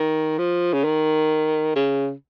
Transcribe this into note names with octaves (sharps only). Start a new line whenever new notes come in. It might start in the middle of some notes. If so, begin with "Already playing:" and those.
Already playing: D#3
F3
C#3
D#3
C#3